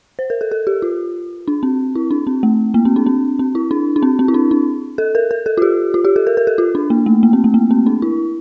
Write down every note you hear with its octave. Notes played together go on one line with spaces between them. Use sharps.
C5
A#4
A4
A4
G4
F4
D4
C4
E4
D4
C4
A3
A#3
C4
D4
C4
C4
E4
D4
D4
C4
C4
E4
D4
D4
A4
A#4
A#4
A4
F4
G4
F4
G4
A4
A#4
A#4
A4
F4
D4
A#3
A3
A#3
C4
A3
A#3
C4
D4
E4